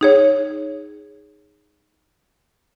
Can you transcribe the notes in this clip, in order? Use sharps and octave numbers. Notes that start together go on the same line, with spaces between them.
D#4 G#4 C#5